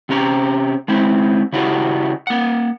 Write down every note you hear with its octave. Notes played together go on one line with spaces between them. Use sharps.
C3 C#4 G4 A#5
G#3 C4 E4
C#3 E4 F#4 G4
A#3 F#5